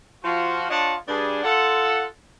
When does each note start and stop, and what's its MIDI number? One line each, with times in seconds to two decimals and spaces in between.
0.24 0.68 53
0.24 0.68 65
0.24 0.68 66
0.69 0.94 62
0.69 0.94 65
0.69 0.94 73
0.69 0.94 75
0.69 0.94 78
0.69 0.94 81
1.07 1.41 43
1.07 1.41 62
1.07 1.41 68
1.44 2.04 65
1.44 2.04 69
1.44 2.04 78